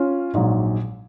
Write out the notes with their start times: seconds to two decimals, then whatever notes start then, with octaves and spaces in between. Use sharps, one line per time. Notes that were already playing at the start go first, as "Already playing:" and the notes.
Already playing: C#4 F4
0.34 A#1 G#2 F#3